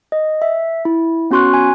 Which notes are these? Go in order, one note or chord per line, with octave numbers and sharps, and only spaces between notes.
D#5
E5
E4
B3 C#4 F#4 C6 C#6 F#6
G#5